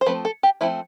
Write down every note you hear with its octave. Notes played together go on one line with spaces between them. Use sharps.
C5
F3 A3 C4 B4
A4
G4
F3 A3 C4 E4